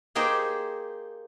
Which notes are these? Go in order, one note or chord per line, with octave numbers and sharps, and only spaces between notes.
A#3 D#4 G4 G#4 C5